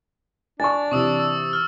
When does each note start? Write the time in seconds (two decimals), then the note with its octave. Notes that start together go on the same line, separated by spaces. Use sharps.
0.60 D4 G#5 C#6 A6
0.91 C3 E3 C#6 D#6 E6
1.20 E6
1.53 F6